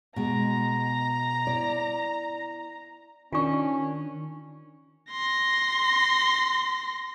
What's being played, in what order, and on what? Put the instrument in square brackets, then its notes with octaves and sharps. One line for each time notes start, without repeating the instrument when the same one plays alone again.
[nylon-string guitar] B2 G#3 [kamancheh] A#5
[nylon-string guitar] E4 D5
[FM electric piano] D#3 D4 [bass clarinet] C#4 [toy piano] F4 C#6
[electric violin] C6 A#6